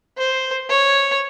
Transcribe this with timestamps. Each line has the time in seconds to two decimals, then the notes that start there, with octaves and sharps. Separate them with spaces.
0.18 C5
0.69 C#5